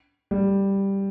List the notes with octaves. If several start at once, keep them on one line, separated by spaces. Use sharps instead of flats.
G3